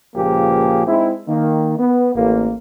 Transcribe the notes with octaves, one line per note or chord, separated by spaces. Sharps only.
C#2 A#2 F3 A#3 G4 G#4
G#3 C4 D#4 E4
D#3 A#3
B3
A1 A#3